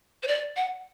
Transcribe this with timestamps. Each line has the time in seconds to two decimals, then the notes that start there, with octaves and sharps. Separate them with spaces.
0.23 C5
0.28 D5
0.56 F#5